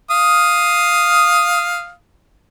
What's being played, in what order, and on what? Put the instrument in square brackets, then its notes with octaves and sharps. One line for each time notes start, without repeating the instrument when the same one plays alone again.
[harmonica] F5 D#6